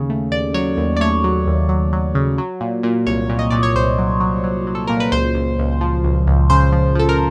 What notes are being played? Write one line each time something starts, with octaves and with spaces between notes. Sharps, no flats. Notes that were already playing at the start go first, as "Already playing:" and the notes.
Already playing: D#2 C#3
A3
D#2 D5
F#3 C#5
D#2
D5
A3 C#5
F#3
D#2
F#3
F#3
C#3
F#3
A#2
A#2
C2 C#5
A#2
D#5
A#2 D5
C#5
C2 C5
F#3
F#3
F#3
F#3
A4
A#2 A#4
B4
C#2 C5
C#2
C#2
F3
C#2
C#2
C#3 C5
F3
F3 A4
A#4